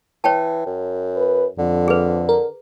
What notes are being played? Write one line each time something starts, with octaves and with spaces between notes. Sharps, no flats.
E3 C#5 G5 A5
F#2
B4
F2 D3
G#4 B4
A#4